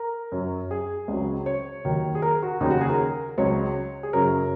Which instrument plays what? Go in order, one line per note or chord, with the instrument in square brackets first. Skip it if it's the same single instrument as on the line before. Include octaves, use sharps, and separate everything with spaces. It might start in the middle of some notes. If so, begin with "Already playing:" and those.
Already playing: [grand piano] A#4
F#2 F#3
G#4
C#2 C#3 F#3
C#5
D#2 D#3 F#3
G#4
A#4
F#4
D#2 C#3 F#3 D#4
F#4
G#4
A#4
C#2 C#3 F#3 C#5
G#4
F#2 C#3 F#3 A#4